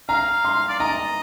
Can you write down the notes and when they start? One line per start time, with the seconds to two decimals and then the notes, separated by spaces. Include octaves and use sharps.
0.09 F5 A#5
0.45 C6
0.69 D5
0.79 D#5 A#5